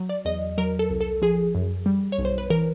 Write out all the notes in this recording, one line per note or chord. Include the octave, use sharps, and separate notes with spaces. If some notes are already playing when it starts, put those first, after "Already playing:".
Already playing: F#3
D5
E2 D#5
F#3 A#4
A4
C2
A4
F3 G#4
F#2
G3
C#5
B1
C5
B4
E3 A#4